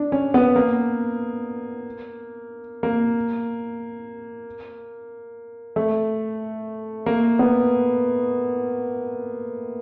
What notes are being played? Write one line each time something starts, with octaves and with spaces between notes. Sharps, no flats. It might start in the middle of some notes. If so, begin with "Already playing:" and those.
Already playing: D4
C#4
B3
A#3
A#3
A3
A#3
B3